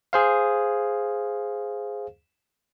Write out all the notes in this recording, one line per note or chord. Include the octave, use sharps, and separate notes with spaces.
G#4 C5 F5